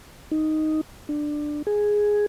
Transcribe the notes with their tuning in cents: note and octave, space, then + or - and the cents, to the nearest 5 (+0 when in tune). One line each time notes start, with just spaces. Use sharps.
D#4 +0
D4 +15
G#4 +0